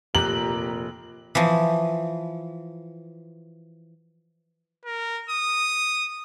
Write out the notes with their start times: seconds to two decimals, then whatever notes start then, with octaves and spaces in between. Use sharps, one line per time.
0.15 F1 A#2 G4 A#5 F#6 F#7
1.35 E3 F3
4.85 A#4
5.30 D#6